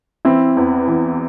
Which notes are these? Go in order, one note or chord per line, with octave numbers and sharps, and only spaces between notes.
E3 C4 E4
E2
E3